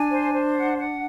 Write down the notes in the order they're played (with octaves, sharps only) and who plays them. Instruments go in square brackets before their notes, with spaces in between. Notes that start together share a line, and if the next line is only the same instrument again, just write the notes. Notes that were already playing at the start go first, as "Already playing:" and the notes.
Already playing: [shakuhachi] D4 [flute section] G#5
[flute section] C5
C5
F#5
F#5